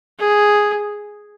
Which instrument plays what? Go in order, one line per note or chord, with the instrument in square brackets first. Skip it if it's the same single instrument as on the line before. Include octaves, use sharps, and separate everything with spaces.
[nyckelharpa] G#4